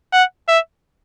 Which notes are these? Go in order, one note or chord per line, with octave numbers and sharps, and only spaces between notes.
F#5
E5